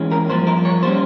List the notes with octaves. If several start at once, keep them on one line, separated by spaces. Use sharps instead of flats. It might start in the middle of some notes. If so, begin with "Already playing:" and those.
Already playing: G#2 E3 G#3 C#4
A#4
G2 F3 A#3 C5
A#4
C#5
G3 C#4 C5